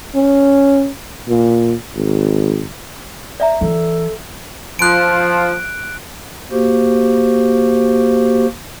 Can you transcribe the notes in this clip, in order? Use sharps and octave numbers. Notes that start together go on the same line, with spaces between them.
C#4
A#2
G#1
D5 E5 A#5
E3 A4
F3 F#6 D7
A#3 F#4 G4 C5